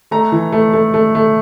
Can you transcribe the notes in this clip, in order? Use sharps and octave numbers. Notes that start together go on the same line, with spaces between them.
A3 A#5
E3
A3
A3
A3
A3